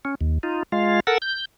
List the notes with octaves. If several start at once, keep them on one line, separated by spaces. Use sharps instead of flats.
C#4
D#2
D#4 F4
G#3 F4 F5
A4 A#4 F#5 E6
G6